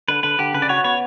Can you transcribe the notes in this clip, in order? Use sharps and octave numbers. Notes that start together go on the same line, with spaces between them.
D3 B4
D3 B4
D3 G4
C#3 B4
D5
F#4 C#5
B3 C#5